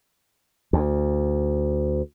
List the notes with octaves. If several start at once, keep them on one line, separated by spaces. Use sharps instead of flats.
D2